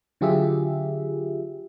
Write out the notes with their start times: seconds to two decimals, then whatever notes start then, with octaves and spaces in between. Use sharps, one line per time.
0.21 D3 F#3 F4 G4 G#4 E5